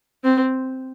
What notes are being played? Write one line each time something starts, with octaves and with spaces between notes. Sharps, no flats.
C4